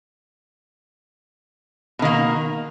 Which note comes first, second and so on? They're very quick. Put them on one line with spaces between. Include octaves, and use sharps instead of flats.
B2 D#3 A#3